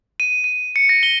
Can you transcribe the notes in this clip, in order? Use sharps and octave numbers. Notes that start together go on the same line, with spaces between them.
D#7
D#7
C#7
A#6
G7